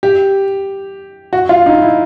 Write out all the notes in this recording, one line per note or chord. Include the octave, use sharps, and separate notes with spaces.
G4
F#4
F4
D#4
E4